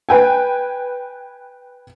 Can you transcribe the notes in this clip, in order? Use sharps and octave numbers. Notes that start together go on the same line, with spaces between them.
B4 G5 G#5